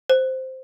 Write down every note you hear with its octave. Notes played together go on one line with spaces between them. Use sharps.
C5